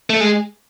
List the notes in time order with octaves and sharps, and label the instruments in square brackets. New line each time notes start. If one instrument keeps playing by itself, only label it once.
[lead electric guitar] A3
G#3